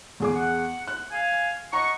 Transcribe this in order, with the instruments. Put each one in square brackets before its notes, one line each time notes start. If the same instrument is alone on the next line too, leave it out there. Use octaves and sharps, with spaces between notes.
[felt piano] E2 G#4 D6
[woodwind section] F#5
[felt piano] F#6
[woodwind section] F5 G#5
[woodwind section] D#5 F#5 C#6 [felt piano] A#5